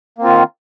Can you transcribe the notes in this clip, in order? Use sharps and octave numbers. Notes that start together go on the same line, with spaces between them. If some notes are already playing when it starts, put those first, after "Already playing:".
D#3 A#3 C4 F4